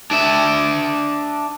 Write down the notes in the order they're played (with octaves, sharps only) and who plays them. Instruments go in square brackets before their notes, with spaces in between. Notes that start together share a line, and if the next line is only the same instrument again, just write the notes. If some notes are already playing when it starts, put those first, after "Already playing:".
[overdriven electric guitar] D4 E5